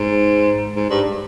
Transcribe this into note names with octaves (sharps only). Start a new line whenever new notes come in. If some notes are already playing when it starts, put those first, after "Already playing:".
Already playing: G#2
G#2
G2